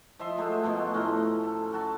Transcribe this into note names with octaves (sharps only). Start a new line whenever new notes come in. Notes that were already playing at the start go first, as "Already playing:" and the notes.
F3 D#5 E5 C6
F#3 G#3 A3 C5
B2 F3 G#3 A3
A2 C#4 A#5 C6
A4
F#3 F#4 A5